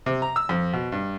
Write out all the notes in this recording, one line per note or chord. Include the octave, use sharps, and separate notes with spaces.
C3
A#5
E6
F2
B2
G2